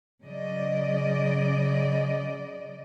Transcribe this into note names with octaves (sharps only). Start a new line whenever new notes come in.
C#3 F#3 D5 D#5